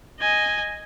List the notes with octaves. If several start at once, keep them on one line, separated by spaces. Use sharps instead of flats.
D#5 G#5